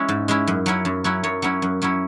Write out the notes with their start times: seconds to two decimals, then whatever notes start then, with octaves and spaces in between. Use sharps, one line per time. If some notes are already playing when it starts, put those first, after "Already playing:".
Already playing: G#3 C#4 E4
0.09 G#2
0.28 G#3 C#4 E4
0.47 F#2
0.66 F#3 C#4 E4
0.85 F#2
1.04 F#3 C#4 E4
1.24 F#2 C#5
1.42 F#3 C#4 E4
1.62 F#2
1.82 F#3 C#4 E4